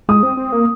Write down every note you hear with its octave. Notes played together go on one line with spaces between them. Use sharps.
G#3 D#6
C4
C4
A#3